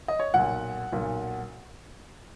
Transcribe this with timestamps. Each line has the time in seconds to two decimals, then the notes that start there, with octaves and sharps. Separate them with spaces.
0.08 D#5
0.19 C#5
0.34 B1 A#2 F#5
0.92 B1 A#2